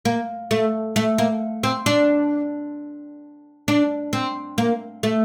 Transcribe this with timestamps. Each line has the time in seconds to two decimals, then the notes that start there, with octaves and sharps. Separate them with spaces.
0.05 A#3
0.51 A3
0.96 A3
1.18 A#3
1.63 C4
1.86 D4
3.68 D4
4.13 C4
4.58 A#3
5.03 A3